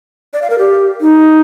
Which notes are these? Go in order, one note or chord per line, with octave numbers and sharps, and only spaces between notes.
D5
F5
A#4
G4
D#4